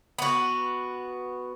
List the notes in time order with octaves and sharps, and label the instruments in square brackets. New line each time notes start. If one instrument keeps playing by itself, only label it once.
[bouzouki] B3 F#4